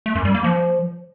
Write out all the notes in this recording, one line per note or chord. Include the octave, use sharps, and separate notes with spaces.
A3
F#2
G3
A#3
F3